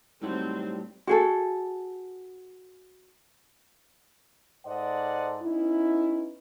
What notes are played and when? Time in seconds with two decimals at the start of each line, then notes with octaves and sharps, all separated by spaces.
0.22 A2 F#3 G3 A3 C4 D#4 F#4
1.07 F#4 G#4 A4
4.66 G#2 A4 C5 D5 D#5 F#5
5.42 B3 C#4 D#4 E4